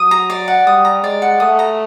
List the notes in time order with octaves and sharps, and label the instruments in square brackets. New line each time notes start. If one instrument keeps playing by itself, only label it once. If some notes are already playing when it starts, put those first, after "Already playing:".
Already playing: [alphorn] F#3 [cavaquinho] D#6
[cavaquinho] A#5
D5
F#5
[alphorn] G3 [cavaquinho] D#6
[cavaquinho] A#5
[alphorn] G#3 [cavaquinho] D5
[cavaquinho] F#5
[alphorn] A3 [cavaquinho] D#6
[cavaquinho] A#5